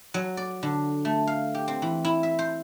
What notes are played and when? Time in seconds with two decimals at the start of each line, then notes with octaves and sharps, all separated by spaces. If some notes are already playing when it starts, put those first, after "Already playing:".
0.14 F#3
0.37 D5
0.63 D3
1.05 A3
1.27 F5
1.54 G4
1.68 C4
1.82 E3
2.05 E4
2.23 E5
2.39 C5